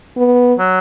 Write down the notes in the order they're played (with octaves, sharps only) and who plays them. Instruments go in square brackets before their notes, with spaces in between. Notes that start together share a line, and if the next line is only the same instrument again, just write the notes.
[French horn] B3
[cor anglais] F#3